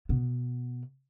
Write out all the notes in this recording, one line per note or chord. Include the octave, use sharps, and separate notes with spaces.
B2 B3